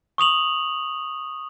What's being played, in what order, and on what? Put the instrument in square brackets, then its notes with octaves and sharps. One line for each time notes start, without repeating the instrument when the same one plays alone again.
[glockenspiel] C#6 D#6 F7 F#7